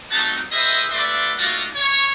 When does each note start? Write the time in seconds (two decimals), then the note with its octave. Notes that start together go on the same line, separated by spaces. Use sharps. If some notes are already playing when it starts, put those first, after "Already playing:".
0.11 G3 A3 C4 D#4 F#4 A5
0.52 E4 G#4 B4 C5 D#5 E5
0.90 A3 F#4 B4 D5 E5 C6
1.38 A3 A#3 D#4 F4 F#4 D5
1.76 C#5